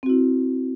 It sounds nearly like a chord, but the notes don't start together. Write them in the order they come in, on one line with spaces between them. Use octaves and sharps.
C4 F#4 E4